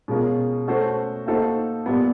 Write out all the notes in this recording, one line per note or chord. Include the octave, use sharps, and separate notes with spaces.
B2 G#3 C#4 F4 A#4
A3 C#4 F#4 A4 C5
A#3 D#4 F#4 A4 C5
A#2 G3 B3